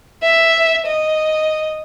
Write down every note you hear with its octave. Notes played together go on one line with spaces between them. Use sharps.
E5
D#5